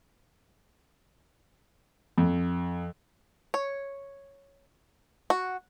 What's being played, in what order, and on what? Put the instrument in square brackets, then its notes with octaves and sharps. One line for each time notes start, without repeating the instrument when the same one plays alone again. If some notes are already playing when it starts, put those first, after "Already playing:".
[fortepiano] F2
[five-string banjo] C#5
F#4